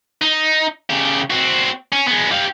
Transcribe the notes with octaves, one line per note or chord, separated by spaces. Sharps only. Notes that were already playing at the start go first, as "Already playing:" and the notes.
D#4
C#3 G4
C4 F#4
C#4
G#3 B3
G4 F5